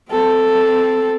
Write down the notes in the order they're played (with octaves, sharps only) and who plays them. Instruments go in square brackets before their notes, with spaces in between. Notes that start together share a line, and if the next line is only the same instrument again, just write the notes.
[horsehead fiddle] C4 A4